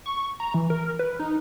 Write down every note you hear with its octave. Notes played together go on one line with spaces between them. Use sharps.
C#6
A#5
E3
A#4
B4
D#4